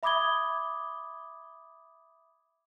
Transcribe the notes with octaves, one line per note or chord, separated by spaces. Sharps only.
E5 B5 D6 D#6 G#6 G7